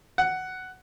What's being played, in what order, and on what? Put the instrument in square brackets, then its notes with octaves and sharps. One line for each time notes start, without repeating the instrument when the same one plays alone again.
[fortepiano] F#5